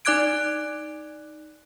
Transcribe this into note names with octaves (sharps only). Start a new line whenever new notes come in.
D#4 D5 D6 F#6 G#6 D7